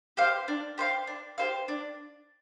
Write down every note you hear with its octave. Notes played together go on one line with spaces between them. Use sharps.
G4 C5 F5
D4
G4 C5 F5
D4
G4 C5 F5
D4